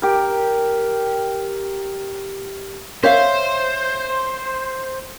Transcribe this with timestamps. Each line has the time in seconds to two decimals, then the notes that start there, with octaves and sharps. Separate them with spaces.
0.02 G4 A#4
3.04 C5 C#5 E5 F5